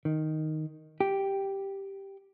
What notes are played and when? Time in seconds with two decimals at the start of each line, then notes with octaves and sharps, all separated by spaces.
0.05 D#3
1.00 G4